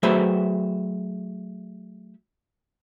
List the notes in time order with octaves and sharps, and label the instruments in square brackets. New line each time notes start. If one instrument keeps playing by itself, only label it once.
[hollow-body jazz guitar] F#3 A3 G#4 B4 C5 E5